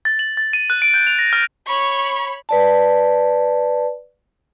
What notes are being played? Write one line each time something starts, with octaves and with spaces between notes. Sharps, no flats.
A6
F#7
A6
D#7
F#6
D7
G6
F7
A#6
F6
C#5 B5 C#6
B4 D5 A5